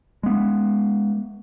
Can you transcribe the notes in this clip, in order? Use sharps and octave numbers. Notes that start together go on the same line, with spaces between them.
G#3 B3